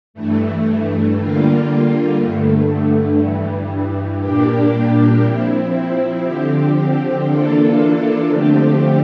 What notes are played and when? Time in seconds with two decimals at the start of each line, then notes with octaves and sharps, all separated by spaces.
0.14 G2 E3 A3
1.15 D3 G3 A#3 F4
2.16 G2 D3 A3
3.17 G2 E3 G3
4.20 A#2 G3 A#3 D4 G4
5.21 F3 C4 E4
6.23 D3 F3 C4 G4
7.25 E3 A#3 D4 F4 A4
8.26 D3 F3 A3 C4 G4